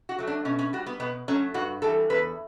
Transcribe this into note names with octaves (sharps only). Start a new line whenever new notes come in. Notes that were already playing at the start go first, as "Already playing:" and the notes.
F#4
F#3 A3
D4
B2 C#4
C#4
G3 F#4
B3
B2 B3
F#3 A3 C#4
G2 F#4
E3 G3 A4
E2 B4